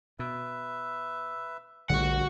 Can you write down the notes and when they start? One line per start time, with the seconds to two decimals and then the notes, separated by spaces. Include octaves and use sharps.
0.19 B2 B4 E5
1.90 A#1 D3 G3 A3 F#4 F#5